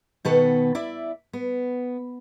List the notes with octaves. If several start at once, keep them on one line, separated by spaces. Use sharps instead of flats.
B2 D#3 B3 A4 B4 F#5
E4 D5 E5
B3